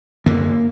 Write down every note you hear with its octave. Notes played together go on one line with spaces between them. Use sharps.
F#2 D3 A#3